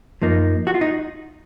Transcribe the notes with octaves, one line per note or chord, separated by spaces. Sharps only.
F#2 F3 A#3 D#4
F#4
F4
D#4